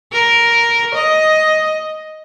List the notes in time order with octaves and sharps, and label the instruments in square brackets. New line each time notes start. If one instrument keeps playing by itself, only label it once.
[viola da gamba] A#4
D#5